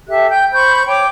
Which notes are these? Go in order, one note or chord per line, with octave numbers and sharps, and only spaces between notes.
G4 A4 E5 F#6
G5 G6
C5 B5 C#6 G6
C#5 G5 D6